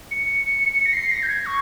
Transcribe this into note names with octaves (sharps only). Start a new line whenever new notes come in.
C#7
A#6
C7
A#6
G6
G#6
C#6